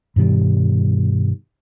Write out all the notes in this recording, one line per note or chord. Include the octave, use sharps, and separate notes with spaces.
G2 B2 D#3 G3